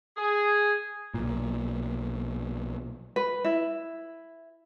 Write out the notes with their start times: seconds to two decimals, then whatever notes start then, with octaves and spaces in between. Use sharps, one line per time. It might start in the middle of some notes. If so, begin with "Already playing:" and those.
0.16 G#4
1.14 B1 A#2
3.16 B4
3.45 E4